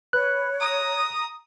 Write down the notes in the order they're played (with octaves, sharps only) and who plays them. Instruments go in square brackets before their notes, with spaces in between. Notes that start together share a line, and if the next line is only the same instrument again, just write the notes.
[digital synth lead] B4 [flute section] C#5 [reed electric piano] F#6
[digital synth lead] A#5 [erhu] D#6